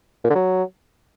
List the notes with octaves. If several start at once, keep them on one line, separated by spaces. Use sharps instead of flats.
A#2
D3
F#3